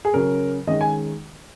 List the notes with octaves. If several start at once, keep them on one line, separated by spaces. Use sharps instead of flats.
G#4
C#3 F#3 C#4 A#4
D#3 G#3 C#4 D#5
G#5